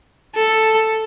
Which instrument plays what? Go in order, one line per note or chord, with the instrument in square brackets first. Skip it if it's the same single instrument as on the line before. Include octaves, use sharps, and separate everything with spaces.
[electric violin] A4